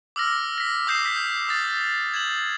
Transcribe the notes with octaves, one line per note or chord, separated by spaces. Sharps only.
D6 E6 F6 A#6
A#6 B6
D6 D#6 G6 A#6 C7 E7
G6 B6
D6 D#6 F6 A6
G#6 E7 F#7